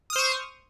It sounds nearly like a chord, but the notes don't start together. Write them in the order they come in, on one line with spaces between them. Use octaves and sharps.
D#6 F6 C5 C#6